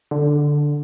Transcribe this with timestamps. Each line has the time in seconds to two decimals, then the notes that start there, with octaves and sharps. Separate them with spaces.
0.11 D3